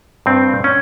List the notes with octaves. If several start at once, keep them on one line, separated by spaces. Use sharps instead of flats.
G2 C4
C#4